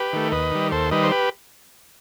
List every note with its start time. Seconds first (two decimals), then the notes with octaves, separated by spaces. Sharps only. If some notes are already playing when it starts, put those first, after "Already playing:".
Already playing: G4 B4
0.13 D#3 A3
0.32 D#2 B4 D#5
0.52 D#3 G3
0.72 D#2 A4 C5
0.91 D#3 G3 B4 D#5
1.03 C5
1.12 G4 B4